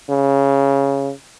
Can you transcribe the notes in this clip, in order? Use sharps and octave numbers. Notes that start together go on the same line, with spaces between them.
C#3